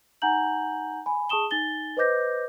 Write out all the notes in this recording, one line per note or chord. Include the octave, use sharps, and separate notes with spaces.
D#4 F#5 G#5 A#5 G6 F#7
G#5 B5
G#4 A5 C#6 D#6 E7 G7
D#4 G#5 A6 G7
B4 C5 D#5 D6 G6 A#6